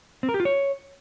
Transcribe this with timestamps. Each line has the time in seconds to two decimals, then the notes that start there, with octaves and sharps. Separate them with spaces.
0.23 C4
0.29 A#4
0.34 G4
0.40 F4
0.45 C#5